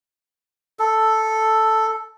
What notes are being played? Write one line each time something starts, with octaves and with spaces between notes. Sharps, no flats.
A4